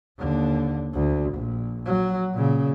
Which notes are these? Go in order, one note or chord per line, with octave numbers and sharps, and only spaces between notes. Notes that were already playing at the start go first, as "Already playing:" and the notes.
D#2 D3
D2
A#1
F#3
A#2 C#3